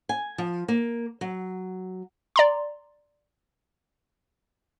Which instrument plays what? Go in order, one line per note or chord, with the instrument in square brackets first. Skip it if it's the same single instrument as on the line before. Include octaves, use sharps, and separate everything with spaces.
[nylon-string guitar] G#5
F3
A#3
F#3
[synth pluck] D5 A#5 C6